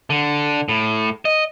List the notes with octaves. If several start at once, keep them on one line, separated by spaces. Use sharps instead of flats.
D3
A2
D#5